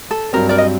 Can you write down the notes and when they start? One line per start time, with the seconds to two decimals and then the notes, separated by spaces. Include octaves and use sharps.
0.11 A4
0.33 G2 F#3 C4 A#4
0.49 A#4 D5
0.58 D#5